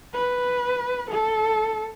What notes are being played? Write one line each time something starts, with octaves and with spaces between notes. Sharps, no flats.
B4
A4